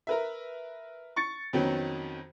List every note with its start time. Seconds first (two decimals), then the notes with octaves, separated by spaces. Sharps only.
0.07 A#4 B4 E5
1.16 C#6 A6 C#7
1.53 F2 D#3 F#3 B3 C#4